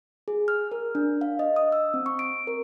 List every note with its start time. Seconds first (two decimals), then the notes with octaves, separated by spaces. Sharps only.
0.28 G#4
0.48 F6
0.72 A#4
0.95 D4
1.21 F5
1.39 D#5
1.56 D#6
1.72 E6
1.94 C4
2.06 C#6
2.19 D7
2.47 A#4